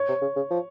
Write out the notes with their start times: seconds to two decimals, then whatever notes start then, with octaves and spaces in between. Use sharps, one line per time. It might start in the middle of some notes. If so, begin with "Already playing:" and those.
Already playing: C#5
0.09 C3
0.22 C#3
0.36 C#3
0.50 F3